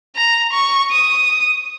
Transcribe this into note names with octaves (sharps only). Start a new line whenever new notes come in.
A#5
C#6
D#6